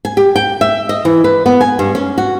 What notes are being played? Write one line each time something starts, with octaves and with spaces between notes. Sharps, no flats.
G#5
G4
G5
E5
D#5
E3
B4
B3
G#5
G2
C#4
F#4